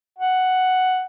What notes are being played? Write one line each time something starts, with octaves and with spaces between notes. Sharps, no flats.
F#5